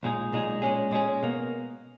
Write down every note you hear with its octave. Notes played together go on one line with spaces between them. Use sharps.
B1 A#2 G#3 D#4 G#4
B1 A#2 G#3 D#4 G#4
A#2 G#3 C#4 G#4
A#2 G#3 C#4 G#4
B2 A#3